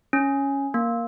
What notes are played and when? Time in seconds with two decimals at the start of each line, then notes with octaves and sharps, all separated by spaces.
0.13 C#4
0.74 A#3